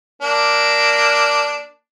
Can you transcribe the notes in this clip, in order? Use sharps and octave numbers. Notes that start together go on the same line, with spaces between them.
A#3 D4